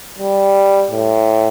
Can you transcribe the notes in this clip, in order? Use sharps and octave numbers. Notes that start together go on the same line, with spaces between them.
G3
A2